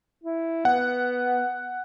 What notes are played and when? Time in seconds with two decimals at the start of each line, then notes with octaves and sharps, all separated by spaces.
0.24 E4
0.65 B3 F#5